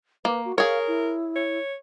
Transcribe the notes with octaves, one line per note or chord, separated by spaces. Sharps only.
A#3 B4
F#4
G#4 A#4 C#5 F5
E4
C#5